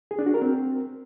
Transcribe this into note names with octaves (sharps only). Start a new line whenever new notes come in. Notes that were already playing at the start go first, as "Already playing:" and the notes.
G#4
D4
F#4
A#4
C4